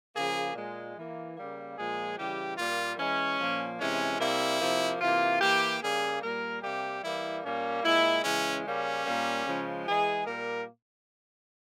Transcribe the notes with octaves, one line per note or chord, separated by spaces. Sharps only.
C#3 F3 A#3 G#4
A#2 G#3
E3 A#3
C#3 G3 A#3
A#2 F3 G#3 G#4
C#3 E3 G3 G4
A#2 G3 A#3 F4
E3 G#3 C#4
A#2 F3 A#3
C3 E3 G#3 C#4
C3 G3 A#3 E4
C3 F3 A#3
C3 E3 A#3 F4
E3 A#3 G4
C#3 G3 A#3 G#4
A#2 G3 A#3 A#4
C3 G3 A#3 G4
E3 G3 A#3 E4
A#2 G3 A#3 C#4
A#2 G#3 E4
C#3 E3 G#3 C#4
C#3 G3 A#3 C#4
A#2 G3 A#3
C#3 F3 G#3
E3 G#3 G#4
A#2 G3 A#3 A#4